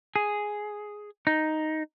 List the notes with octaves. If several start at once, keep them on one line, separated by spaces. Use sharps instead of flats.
G#4
D#4